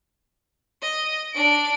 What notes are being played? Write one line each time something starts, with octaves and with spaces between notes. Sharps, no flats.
D#5
D4 D7